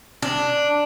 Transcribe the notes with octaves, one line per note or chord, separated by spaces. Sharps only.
D4